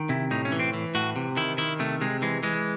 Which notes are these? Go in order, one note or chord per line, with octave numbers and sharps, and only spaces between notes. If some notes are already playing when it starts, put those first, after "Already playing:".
Already playing: D#3
C3 E4
A2 D#4
C#4
E3
C4
E3
A2 F#4
C3
D#3 E4
D#3 E4
C3 A3
C3 G#3
E3 G#3
E3 G#3